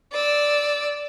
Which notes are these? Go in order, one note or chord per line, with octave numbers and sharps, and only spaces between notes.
D5 E6